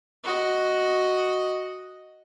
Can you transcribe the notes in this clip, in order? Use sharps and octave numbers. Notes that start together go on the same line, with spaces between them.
F#4 D#5